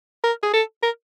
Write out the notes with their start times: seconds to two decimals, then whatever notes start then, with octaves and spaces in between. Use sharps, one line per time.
0.24 A#4
0.43 G#4
0.53 A4
0.83 A#4